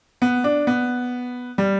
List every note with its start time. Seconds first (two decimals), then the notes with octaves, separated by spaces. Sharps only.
0.22 B3
0.44 D4
0.67 B3
1.58 G3